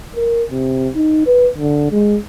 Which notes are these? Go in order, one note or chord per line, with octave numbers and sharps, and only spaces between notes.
A#4
C3
D#4
B4
D3
G#3